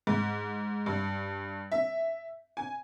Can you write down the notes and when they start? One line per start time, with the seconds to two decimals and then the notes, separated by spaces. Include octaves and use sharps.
0.07 G#2
0.86 G2
1.72 E5
2.57 G#5